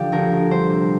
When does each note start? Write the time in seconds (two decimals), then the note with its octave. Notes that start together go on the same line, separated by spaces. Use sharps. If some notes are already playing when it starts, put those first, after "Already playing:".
Already playing: D3 F3 G4
0.12 D2 A#4
0.32 D2
0.51 G3 C5
0.70 C3